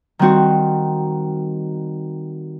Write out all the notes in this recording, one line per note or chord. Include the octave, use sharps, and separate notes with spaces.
D#3 G3 C4 F#4